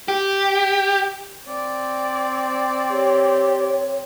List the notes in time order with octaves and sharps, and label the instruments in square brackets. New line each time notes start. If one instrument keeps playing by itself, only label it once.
[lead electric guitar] G4
[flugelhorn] C4 [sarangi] D5
[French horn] G4 [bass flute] C#5